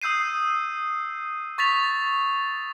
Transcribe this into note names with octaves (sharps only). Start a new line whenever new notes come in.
D#6 E6 G6 C7 D#7
C#6 A6 B6 F7